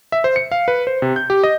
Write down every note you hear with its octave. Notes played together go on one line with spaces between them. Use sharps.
E5
C5
C#7
F5
B4
C5
C3
G6
G4
D#5